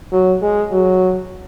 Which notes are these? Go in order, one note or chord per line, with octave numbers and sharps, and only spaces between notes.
F#3
G#3
F#3